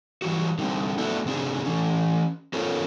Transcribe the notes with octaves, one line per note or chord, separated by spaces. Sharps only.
E3 G3 F#4
D3 G3 C4
A3 B3 D4 E4 F#4 A4
C3 C4 D4 G#4
E3 C#4
B3 C#4 F4 A4 A#4 C#5